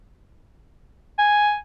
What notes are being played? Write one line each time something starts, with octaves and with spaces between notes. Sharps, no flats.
G#5